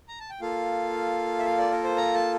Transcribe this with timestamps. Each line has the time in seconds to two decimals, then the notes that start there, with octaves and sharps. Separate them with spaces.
0.08 A#5
0.20 A5
0.30 G5
0.41 A#3 F4 A4 F5
1.39 E5
1.45 F5
1.58 D5
1.72 A#4
1.84 C5
1.97 A#5
2.14 A5